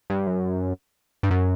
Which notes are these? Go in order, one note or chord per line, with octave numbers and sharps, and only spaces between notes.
G2
F#2
G2
F#2